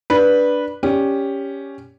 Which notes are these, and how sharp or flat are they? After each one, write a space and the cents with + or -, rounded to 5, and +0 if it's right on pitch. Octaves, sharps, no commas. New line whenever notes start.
D4 +0 B4 -10
C#4 +5 G4 +10 D5 +0